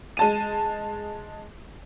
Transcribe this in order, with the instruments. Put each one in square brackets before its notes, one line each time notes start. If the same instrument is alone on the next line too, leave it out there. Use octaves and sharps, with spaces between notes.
[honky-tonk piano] G#3 A5 D#7